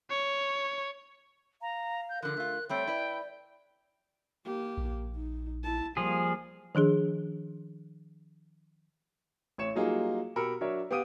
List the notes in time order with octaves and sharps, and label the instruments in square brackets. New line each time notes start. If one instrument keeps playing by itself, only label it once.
[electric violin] C#5
[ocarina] F5 [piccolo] A#5
[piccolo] G6
[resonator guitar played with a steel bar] D3 F3 [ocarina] A#4 [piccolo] F#6
[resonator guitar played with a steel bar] A3 F4
[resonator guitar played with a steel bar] G3 A3 C4 [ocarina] C#5 [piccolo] G5
[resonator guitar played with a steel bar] E4 B4 [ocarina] D5
[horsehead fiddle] A#3 G4
[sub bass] A#1
[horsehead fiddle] D#4
E4 A5
[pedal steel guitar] F3 G#4 [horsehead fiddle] G3 A#3
[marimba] D#3 F3 D4 G#4
[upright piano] A1 C#5 C#7 E7
F#3 G3 A#3 D#4 F4 G#4
B2 G4 A#4 B5 E6 C#7
F#3 D4 A#4 C#5 E5
B3 G4 F5 D#6 D7 D#7